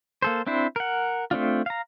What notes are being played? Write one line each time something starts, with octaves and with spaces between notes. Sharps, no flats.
A#3 A4 C5
C4 D4 E4 C5
A#4 F#5
A3 C4 D4 F4
F5 A#5